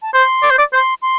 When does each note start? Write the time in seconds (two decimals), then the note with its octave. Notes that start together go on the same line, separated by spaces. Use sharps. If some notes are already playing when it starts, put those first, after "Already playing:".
0.02 A5
0.14 C5 C6
0.43 D5
0.51 C5
0.59 D5
0.73 C5 C6
1.02 C6